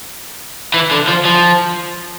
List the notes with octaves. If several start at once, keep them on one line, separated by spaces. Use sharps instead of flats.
E3
D3
F3
F3